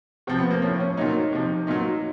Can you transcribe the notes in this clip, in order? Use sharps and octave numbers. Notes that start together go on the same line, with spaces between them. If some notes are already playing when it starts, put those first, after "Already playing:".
C3 F3 C4
B3
A#3
A2 F3 C#4
C#4
A#2 F#3 D#4
C3 F3
A#2 F#3 D#4